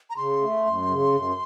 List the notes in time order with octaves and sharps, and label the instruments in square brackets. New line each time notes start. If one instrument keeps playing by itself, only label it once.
[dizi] A#5
[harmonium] C#3 [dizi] C6
[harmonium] A3
F#2
C#3
F#2